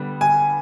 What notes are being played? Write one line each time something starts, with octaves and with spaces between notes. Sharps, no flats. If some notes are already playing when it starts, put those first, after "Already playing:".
Already playing: D3 G3 B3
G#5